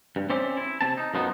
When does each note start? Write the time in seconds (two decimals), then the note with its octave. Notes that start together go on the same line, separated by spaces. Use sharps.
0.16 G2
0.30 C4 C#4 C5 D5 E5
0.57 E4
0.81 C3 C4 A5
0.97 D#4
1.14 F#2 F3 B3 D#4